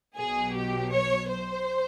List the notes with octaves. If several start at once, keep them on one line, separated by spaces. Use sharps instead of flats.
B1 B2 F#3 G#4
G4
C#5
C5